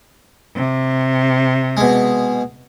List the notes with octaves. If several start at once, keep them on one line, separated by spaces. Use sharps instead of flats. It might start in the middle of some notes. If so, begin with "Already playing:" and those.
C3
B2 G#3